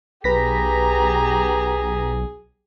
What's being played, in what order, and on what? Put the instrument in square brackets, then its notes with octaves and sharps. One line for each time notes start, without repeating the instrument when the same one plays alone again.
[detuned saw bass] B1 [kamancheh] G4 A#5 [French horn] G#4 [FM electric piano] B4 A#6 B6